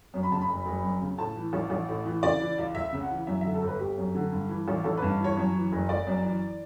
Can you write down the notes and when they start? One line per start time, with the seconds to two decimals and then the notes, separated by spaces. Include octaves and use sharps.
0.14 F#2
0.23 B5
0.31 C#3 A5
0.41 B5
0.49 F#1
0.66 F#1
0.83 F#2
1.01 C#3
1.18 A2 A5
1.36 E3
1.53 A1
1.70 A1
1.89 A2
2.05 E3
2.23 C#3 D5
2.40 E3
2.58 C#2
2.75 C#2 E5
2.93 C#3
3.01 F#5
3.11 E3
3.27 F#2 E5
3.41 D3 E5
3.54 A4
3.62 G1
3.67 B4
3.79 G1 G4
3.98 F#2
4.15 D3
4.32 G2
4.49 E3
4.68 A1
4.84 A1 A4
4.97 B4
5.02 G2
5.20 E3 C#5
5.37 F#2
5.54 E3
5.72 F#1
5.89 F#1 D5
6.07 F#2
6.24 E3